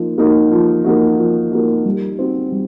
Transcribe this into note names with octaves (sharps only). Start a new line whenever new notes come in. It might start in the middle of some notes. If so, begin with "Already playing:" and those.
Already playing: F3 A#3 D#4
A#3 D#4 F#4
F3
A#3 D#4 F#4
F3
A#3 D#4 F#4
G3
C4 D#4 F#4
G3